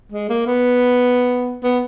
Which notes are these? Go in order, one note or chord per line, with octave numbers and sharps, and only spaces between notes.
G#3
A#3
B3
B3